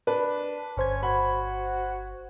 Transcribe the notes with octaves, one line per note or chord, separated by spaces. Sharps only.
D4 B4
G1 C#4 C5 G#6
F#4 B5